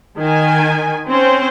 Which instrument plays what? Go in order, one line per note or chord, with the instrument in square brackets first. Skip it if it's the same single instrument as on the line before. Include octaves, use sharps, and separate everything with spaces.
[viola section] D#3 G#5
C4 C#4 C5